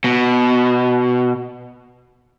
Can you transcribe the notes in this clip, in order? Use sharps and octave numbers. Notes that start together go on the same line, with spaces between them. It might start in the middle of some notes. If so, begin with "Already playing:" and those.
B2